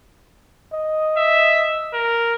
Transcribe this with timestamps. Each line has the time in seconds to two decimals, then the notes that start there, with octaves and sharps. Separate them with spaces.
0.73 D#5
1.18 E5
1.94 A#4